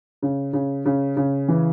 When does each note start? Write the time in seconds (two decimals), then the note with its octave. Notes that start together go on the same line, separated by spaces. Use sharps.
0.22 C#3
0.53 C#3
0.86 C#3
1.17 C#3
1.48 E3